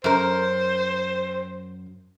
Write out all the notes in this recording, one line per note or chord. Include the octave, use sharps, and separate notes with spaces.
F#2 A#4 C5